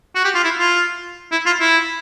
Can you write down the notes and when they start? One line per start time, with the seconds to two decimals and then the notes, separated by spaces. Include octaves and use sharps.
0.15 F#4
0.25 G4
0.35 F4
0.44 E4
0.59 F4
1.32 E4
1.46 F4
1.61 E4